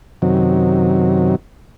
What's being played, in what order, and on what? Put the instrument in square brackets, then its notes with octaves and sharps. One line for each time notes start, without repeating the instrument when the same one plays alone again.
[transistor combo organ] F#2 C3 D#3 F#3